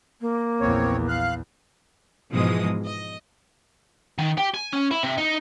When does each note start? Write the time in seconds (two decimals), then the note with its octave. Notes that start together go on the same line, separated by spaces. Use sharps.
0.21 A#3
0.61 A#1 E2 C4 C#5
1.08 F5 F#6
2.31 G#2 B2 E3 F3 G#3 D#6
2.84 D#5
4.18 D#3
4.38 G4
4.54 G#5
4.73 C#4
4.91 E4
5.03 C3
5.18 D#4